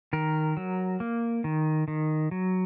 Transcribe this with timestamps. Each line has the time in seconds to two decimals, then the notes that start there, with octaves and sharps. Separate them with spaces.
0.13 D#3 A#4
0.57 F#3
1.00 A#3
1.44 D#3
1.88 D#3
2.31 F#3